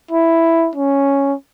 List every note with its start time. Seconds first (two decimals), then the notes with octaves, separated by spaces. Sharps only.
0.11 E4
0.76 C#4